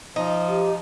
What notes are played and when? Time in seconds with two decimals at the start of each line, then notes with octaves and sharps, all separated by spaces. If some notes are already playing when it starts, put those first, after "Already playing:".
0.16 F3 D#4
0.48 G4